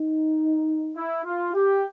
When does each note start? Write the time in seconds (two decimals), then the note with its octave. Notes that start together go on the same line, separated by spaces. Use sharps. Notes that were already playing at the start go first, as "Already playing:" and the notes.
Already playing: D#4
0.96 E4
1.25 F4
1.54 G4